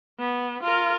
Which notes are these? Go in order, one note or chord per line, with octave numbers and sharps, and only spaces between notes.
B3
F4 A#4